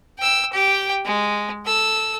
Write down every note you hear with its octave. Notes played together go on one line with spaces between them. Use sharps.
G5 E6
G4 G5
G#3
A4 E6